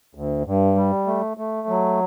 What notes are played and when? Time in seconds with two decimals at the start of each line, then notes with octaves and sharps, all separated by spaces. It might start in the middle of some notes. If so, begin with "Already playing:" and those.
0.15 D2
0.46 G2
0.76 G3
1.07 A3
1.37 A3
1.68 F#3